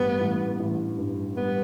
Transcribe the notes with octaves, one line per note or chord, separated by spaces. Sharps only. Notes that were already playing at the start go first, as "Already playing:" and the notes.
Already playing: A1 G2 G3 B3
A1
A1
G2
G3 B3